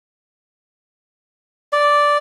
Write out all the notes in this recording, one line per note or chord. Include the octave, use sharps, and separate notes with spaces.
D5